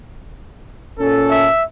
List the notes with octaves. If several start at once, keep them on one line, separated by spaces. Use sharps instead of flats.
A#2 C#4 A4
E5